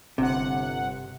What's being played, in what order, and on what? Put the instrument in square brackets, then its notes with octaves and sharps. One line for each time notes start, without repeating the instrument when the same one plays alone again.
[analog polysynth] G1 F#5 [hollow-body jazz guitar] C3